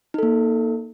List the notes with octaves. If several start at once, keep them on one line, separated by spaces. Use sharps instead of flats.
A#3 D#4 A4